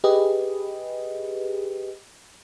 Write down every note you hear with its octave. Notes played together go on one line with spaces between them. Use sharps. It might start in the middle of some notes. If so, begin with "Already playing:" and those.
G4 G#4 B4 D#5